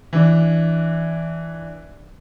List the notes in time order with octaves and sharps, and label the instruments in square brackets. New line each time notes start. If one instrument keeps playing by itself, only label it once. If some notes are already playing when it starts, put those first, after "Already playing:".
[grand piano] E3 D4